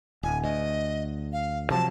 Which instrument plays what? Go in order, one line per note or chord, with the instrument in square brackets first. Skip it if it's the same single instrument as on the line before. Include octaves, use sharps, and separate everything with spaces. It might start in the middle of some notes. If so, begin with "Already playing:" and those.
[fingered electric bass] D1 [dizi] G#5
[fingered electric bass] D2 [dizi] D#5
[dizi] F5
[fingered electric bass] C3 F3 F#3 [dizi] A5